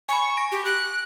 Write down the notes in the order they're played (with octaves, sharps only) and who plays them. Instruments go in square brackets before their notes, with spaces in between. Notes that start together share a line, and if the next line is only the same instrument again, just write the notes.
[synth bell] G#5 B5 [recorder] C#6
[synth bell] A#6 D7
[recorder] G4
F#6